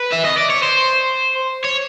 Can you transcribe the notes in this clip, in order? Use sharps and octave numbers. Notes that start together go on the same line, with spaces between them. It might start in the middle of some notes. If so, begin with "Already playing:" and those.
Already playing: B4
E5
D#5
D5
C#5
C5
C#5